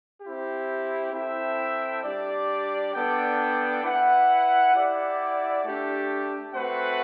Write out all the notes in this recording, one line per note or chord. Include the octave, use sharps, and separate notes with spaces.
C4 E4 G4
C4 E4 A4 E5 G5
G3 D4 G4 D5
B3 D4 A4 D5 G5
E4 B4 F#5
E4 G4 D5 F#5
A3 D4 G4
A3 C4 F#4 B4 F#5